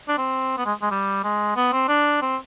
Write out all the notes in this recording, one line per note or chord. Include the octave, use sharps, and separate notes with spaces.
D4
C4
B3
G#3
G#3
G3
G#3
B3
C4
D4
C4